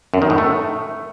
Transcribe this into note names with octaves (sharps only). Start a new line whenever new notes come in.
F#2
D#3
A2
A3